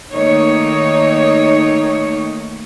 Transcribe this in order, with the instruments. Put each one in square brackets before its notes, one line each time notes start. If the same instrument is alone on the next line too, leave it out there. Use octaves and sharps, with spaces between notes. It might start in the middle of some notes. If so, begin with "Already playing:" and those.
[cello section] D#3 A3 A#3 D#4 C#5